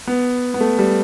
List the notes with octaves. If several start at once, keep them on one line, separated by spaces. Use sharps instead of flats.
B3
B3
A3
G3